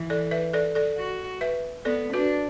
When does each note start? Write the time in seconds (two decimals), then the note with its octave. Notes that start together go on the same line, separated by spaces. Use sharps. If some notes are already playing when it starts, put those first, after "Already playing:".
Already playing: E3
0.10 A4 D5
0.31 B4 E5
0.53 A4 D5
0.75 A4 D5
0.97 F#4
1.41 B4 E5
1.85 B3 A4 D5
2.13 D4 F#4 B4